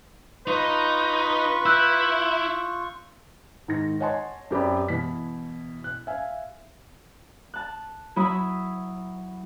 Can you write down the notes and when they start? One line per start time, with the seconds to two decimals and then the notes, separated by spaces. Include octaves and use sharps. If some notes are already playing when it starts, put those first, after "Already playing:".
0.47 D#4 F4 B4 C#6
1.66 E4 E6 F#6 G6
3.68 G#2 D#3 A#6
4.00 C#5 D#5 F#5 G#5 A5 C6
4.51 F#2 C4 G4 B4 D5 B5
4.88 B2 E3 E4 B6
5.84 F#6
6.07 E5 F5 G#5
7.54 A5 F#6
8.16 F#3 E4 E5 B5 D#6